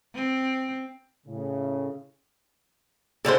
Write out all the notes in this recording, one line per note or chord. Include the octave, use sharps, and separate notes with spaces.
C4
A2 C#3
A2 D3 G#3 A4 C5